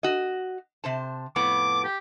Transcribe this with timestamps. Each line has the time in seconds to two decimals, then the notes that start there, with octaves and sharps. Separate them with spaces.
0.03 F#4 D#5
0.84 C3 C5 A5
1.36 F2 A2 B3 D6
1.84 G4